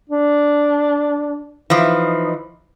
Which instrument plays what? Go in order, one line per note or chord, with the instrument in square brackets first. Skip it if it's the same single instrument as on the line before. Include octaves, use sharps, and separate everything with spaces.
[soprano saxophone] D4
[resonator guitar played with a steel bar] E3 F3 [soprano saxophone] D#4